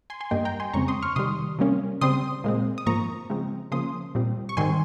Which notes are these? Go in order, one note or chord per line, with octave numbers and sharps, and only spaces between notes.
G#5 C6
G#5 C6
G2 G3 A#3 D#5 G5
G5 A#5
G#5 C6
F2 C#3 G#3 C4 A#5 C#6
C6 D#6
C#6 F6
C3 D#3 G3 C6 D#6
C3 G3 A#3 C#4
C#3 G3 C4 C6 D#6
A#2 G#3 C4
D#6
G#2 F3 A#3 A#5 C#6
C#3 F3 G#3 C4
C#3 F3 A#3 C#4 C6 D#6
A#2 G3 C4
C#6
G#2 D#3 G3 C4 G#5 C6